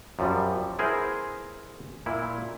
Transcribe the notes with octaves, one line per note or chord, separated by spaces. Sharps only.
F#2 F3 G3
B3 E4 G#4 A#4 C5
A#2 E4